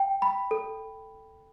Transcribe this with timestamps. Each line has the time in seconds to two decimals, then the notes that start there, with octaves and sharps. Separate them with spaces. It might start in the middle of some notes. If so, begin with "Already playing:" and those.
Already playing: G5
0.22 B5
0.51 A4